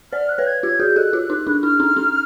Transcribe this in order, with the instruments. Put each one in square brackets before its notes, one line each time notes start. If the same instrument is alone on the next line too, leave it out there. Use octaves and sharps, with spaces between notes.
[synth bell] C5 D5 [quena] F6
[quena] F#6
[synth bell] B4 C#5
[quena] G#6
[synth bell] F4 G4 [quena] G#6
[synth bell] F#4 G#4 [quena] G6
[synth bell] G4 A4 [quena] F#6
[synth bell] F4 G4
D#4 F4
D4 E4
[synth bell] D4 E4 [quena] F6
[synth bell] C#4 D#4
C#4 D#4